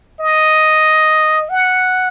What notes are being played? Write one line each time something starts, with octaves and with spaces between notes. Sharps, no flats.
D#5
F#5